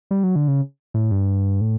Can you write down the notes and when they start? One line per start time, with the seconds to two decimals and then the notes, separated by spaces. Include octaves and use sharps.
0.11 G3
0.23 F#3
0.36 D3
0.48 C#3
0.94 A2
1.11 G2
1.61 A2